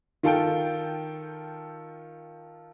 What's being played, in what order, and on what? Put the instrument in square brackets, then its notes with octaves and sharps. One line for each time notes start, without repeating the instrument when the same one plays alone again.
[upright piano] D#3 F4 A4 G5